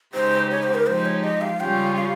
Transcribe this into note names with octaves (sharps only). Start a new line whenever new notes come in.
C#3 G#3 D#4 G4 C5
C#5
C5
A#4
F3 G#3 D#4 G4 C5
C#5
D#5
F5
C#3 G3 C#4 F4 G5
F5